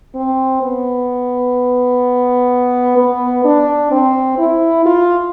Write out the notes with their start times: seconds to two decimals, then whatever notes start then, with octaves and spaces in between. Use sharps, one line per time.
0.15 C4
0.62 B3
2.97 B3
3.45 D4
3.91 C4
4.38 E4
4.86 F4